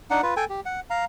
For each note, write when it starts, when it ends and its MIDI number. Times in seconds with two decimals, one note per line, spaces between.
0.10 0.21 62
0.10 0.21 63
0.10 0.21 78
0.23 0.34 65
0.23 0.34 71
0.36 0.45 69
0.36 0.45 79
0.36 0.45 80
0.49 0.61 67
0.65 0.80 78
0.90 1.05 77
0.90 1.05 82